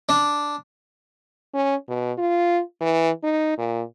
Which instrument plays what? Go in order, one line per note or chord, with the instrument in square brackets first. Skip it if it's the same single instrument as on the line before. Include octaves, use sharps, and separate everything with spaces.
[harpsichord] D4
[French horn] C#4
B2
F4
E3
D#4
A#2